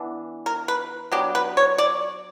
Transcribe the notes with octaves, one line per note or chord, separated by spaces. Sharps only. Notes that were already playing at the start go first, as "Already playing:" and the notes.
Already playing: E3 B3 D4
A#4
B4
F#3 B3 D4 G4
B4
C#5
D5